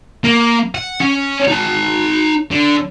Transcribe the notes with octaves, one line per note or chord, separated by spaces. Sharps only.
A#3
F#5
C#4
D#4 A5
D3